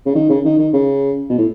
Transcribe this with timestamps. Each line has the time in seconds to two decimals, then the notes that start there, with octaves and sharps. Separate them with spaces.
0.06 C#3
0.15 D#3
0.29 C#3
0.45 D#3
0.58 D#3
0.74 C#3
1.30 B2
1.38 A2